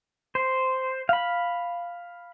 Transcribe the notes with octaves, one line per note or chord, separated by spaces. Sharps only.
C5
F5 B5